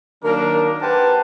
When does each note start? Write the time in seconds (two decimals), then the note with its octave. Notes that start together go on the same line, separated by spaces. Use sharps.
0.24 D#3 F#3 A#3 D4 A#4
0.80 G4 B4 C5 F#5 G#5 A5